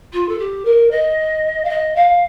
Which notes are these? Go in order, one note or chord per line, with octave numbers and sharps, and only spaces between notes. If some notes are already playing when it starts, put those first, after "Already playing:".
F4
A4
G4
A#4
D#5
F5
D#5
F5